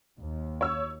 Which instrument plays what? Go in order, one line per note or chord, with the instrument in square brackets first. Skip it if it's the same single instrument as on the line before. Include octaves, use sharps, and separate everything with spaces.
[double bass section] D#2
[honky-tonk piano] C#5 E6